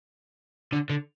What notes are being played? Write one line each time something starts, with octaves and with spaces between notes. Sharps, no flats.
D3
D3